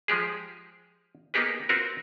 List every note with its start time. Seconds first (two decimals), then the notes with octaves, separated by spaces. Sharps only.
0.08 F3 G#3 G4 G#4
1.34 A#3 B3 D#4 G4 G#4 B4
1.69 C4 F4 F#4 A#4 B4